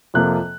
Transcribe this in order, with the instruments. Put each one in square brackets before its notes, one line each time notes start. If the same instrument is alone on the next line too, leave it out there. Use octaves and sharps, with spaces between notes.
[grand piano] F2 C3 F3 A#3 F#6